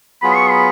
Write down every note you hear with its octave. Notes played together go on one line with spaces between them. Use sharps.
F#3 B3 F4 G#4 B5
C#6
B5